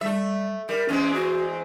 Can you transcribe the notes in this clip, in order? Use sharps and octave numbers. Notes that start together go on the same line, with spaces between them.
G3 A3 E5
G3 A#4
E2 G#3 C4 C#4
F#4